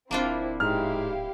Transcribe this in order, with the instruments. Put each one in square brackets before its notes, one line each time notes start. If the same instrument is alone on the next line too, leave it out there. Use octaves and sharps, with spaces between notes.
[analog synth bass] D1 [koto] A#3 D4 F4 [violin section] C4 E4
[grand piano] G#2 F6 [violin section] E4 G4 F5